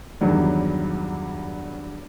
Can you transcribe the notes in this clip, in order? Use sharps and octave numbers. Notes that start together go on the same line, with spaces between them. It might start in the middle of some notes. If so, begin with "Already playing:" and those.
E2 G2 D#3 F#3 G3